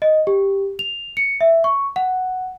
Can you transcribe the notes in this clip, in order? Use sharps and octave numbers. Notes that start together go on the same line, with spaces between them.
D#5
G4
F7
C#7
E5
C#6
F#5